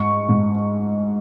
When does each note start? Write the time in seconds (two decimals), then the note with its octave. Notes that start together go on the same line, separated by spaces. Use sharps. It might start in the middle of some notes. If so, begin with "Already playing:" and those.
Already playing: G#2 C#6
0.29 G#2